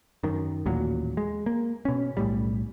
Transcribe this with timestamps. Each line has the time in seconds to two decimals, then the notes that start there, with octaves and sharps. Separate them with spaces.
0.23 F#2 D#3
0.66 A1 D#2 A#2 F#3
1.17 G#3
1.46 A#3
1.85 B2 C#4
2.17 B1 A2 G3